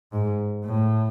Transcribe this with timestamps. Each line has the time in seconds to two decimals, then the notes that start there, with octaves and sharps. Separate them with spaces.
0.13 G#2
0.65 A2